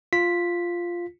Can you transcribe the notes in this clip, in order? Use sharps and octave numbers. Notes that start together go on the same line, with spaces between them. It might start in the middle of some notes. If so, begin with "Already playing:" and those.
F4 B6